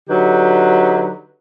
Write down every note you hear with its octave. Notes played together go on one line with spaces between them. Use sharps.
D3 F#3 D#4 G4 B4